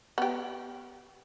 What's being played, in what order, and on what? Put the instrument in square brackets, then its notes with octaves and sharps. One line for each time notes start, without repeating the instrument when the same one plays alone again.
[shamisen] B3 G4